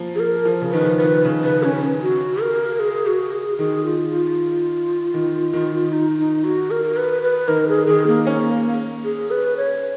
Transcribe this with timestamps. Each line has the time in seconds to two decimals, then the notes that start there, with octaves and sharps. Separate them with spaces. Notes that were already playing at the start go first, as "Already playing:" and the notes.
Already playing: F3 A#3
0.15 G#4
0.20 A#4
0.45 F3
0.61 C#3
0.72 D#3 B4
0.85 F3
0.98 B4
1.04 D#3
1.25 C#3
1.44 B4
1.64 C#4
2.02 F#4
2.42 A#4
2.80 G#4
3.06 F#4
3.32 G#4
3.58 D#3 G#4
3.84 F4
4.10 F4
5.14 D#3
5.53 D#3
5.92 D#4
6.19 D#4
6.44 F#4
6.71 A#4
6.97 B4
7.23 B4
7.48 D#3 A#4
7.68 G#4
7.87 D#3 G#4
8.07 A#3
8.27 C#4
9.04 G#4
9.31 B4
9.57 C#5